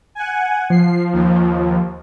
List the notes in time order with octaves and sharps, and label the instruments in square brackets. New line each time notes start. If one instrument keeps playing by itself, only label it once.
[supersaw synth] F#5 G#5
[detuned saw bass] F3 [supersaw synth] C7
[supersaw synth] D#2